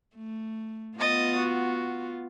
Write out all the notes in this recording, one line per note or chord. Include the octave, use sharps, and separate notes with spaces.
A3
B3 F4 D#5 D#6 A6
F#4